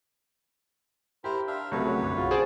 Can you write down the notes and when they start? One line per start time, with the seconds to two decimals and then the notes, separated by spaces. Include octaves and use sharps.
1.24 E4 G4 A#4 C5
1.47 D4 E5 F5
1.71 C2 C#3 F#3 A3 B4 C#5
2.03 F#2 D3
2.17 B1 C#3 F4 F#4
2.31 G#4 C5 D5 A5